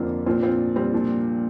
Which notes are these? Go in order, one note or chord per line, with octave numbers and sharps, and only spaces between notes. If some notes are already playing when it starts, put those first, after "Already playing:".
Already playing: F2 D3 A#3 C4 D4 F4
A#2 F3 C4 D4 F4
C4 F4
G3 C4
A#2 F3 D4